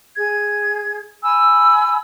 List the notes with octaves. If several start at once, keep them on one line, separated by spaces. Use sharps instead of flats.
G#4 G#6
G#5 B5 E6